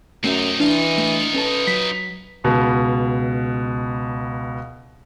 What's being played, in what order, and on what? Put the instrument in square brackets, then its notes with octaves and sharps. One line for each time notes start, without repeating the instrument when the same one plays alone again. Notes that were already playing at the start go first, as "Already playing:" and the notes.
[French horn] F#2 [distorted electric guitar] C3 D#4 [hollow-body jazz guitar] A3 C#4 E5
[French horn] E3 [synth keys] D4 [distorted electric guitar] D#4 F4
[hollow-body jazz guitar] A3
[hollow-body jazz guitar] C#4 A4 A5 [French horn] B4
[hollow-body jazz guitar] F#3 [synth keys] B6
[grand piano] C#2 B2